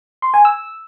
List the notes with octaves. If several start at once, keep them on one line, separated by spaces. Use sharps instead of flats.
C6
G#5
E6